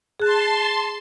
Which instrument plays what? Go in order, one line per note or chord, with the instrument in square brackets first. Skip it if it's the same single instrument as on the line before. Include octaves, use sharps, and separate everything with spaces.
[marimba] G#4 F#6 [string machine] A5 C6